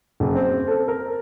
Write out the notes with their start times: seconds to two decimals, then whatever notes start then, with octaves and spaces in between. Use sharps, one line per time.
0.20 F#1
0.35 C4
0.68 A4
0.88 A#4